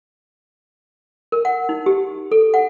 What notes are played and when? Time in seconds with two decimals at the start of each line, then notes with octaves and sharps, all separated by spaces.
1.32 A#4
1.45 F#5
1.69 D#4
1.86 G4
2.32 A4
2.54 F#5